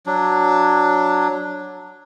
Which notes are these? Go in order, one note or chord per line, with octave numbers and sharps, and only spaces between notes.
F#3 D4